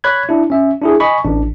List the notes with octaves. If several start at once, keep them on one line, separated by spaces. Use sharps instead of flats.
C#5 B5 F#6 G#6
D4 E4
C#4 E5
D4 E4 G#4
D#5 G#5 B5 C#6
A1 D4